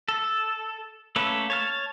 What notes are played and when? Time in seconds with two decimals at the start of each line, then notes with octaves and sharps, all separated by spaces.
0.09 A4
1.16 A3 A#3 C#4 A4 B4
1.50 C#5 A5 F6